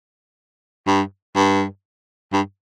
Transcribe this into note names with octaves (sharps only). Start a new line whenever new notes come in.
G2
G2
G2